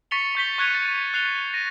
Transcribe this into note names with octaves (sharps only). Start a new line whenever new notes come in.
C#6 A6 B6 C#7 F7 G7
C#6 G6 B6 G7
C#6 F#6 G#6 C#7 D#7 F7
A6
F#6 C7 F7 G7
A#6 D#7